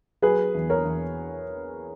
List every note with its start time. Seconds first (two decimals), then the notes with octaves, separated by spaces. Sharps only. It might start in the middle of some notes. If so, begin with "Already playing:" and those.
0.22 F#3 G#4 B4
0.54 E2
0.70 A#4 C#5
0.85 E2